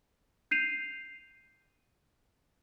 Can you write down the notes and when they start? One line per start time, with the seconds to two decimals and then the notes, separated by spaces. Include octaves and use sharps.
0.51 G6 C7 D#7 F7